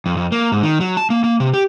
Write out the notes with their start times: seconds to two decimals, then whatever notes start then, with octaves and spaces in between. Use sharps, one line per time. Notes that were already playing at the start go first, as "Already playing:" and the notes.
0.06 F2
0.17 F2
0.32 A#3
0.52 G#2
0.63 D#3
0.80 F#3
0.97 A5
1.10 A#3
1.24 A#3
1.40 C3
1.54 G4